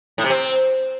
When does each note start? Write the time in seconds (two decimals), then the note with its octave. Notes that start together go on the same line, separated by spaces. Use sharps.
0.18 A2
0.24 C3
0.30 C4